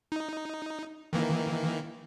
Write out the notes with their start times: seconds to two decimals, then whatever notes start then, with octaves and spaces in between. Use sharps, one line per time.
0.12 D#4
1.13 D#3 E3 A#3